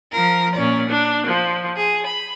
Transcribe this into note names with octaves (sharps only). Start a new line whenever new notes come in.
F3 A#4
A#2 C#4 D5
D4
F3
G#4
B5